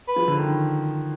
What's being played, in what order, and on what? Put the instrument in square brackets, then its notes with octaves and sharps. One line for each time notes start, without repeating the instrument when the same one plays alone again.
[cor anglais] B4
[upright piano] F3
D3
D#3